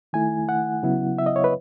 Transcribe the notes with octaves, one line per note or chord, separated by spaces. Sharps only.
D#3 A3 E4 G#5
F#5
C#3 F#3 B3 E4
E5
D#5
C#5
B4